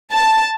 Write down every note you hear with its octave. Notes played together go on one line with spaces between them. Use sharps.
A5